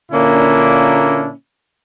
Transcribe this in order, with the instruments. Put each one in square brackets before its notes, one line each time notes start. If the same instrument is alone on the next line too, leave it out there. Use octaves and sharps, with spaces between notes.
[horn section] A#2 D3 A#3 C#4 D4 E4